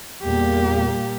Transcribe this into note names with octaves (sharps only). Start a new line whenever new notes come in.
E2 A#2 G3 A#3 G4